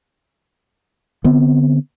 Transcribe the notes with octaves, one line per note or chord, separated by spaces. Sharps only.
D3 B3 C4